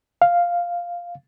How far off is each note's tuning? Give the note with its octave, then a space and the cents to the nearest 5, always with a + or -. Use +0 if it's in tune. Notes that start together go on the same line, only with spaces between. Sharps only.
F5 +0